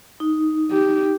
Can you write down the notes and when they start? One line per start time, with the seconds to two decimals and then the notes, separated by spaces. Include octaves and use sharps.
0.20 D#4
0.71 G4